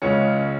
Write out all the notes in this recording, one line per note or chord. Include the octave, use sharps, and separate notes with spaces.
C#2 C#3 G#3 C#4